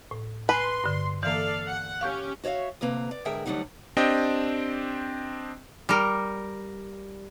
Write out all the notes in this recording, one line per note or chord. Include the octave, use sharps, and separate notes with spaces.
A2
B4 G#5 A5 C6
G2 D3
E3 A#3 A4 D5 F5
F#5
C#4 G4 F5 C#6 G6
F#4 C#5 D5 E5 F5
D2 C3 A#3 B4 A#5
D5
G#2 D3 G#4 A#4 E5 G5
D2 F#3 G3 D#4 F#5
C4 D4 G4 D#5 G5
G3 A#4